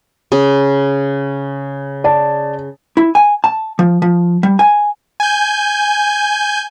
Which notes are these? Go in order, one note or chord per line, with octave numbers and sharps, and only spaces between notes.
C#3
D5 A5
E4
G#5
A5
F3
F3
G3
G#5
G#5 G6